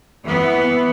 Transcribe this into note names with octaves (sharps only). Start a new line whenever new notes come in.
E3 B3